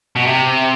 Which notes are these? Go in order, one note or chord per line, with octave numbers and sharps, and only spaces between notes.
B2
C3